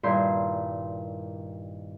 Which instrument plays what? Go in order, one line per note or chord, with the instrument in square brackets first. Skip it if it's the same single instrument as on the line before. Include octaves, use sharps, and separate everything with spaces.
[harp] G2 A#2 D#3 E4 A#4 C6